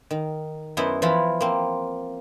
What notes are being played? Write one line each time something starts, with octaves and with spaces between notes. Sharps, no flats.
D#3
F#2 B3 E4 C5 D#5
E3 F3 E4 F4 B5
A#3 C4